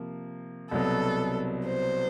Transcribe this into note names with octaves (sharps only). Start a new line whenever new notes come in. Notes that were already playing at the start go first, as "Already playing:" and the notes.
Already playing: C3 F3 A#3
C2 B2 F#3 B3 A4
C5